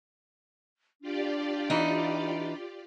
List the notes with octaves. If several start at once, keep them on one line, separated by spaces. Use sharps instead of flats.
D4 F4 G4 D5
E3 D#4